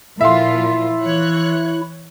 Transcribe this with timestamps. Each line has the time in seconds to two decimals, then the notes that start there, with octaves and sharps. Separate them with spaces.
0.21 A#2 F3 E4 F4 E5 F5 C6
1.02 E3 C#5 F#6